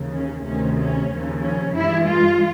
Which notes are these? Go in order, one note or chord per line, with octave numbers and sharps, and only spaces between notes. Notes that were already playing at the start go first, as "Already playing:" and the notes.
Already playing: D#2 C#3 E3
C#4
D2 C3 D#3 C#4
C#4
D#2 C#3 F3
C#4
G2 E3 G#3 E4
F4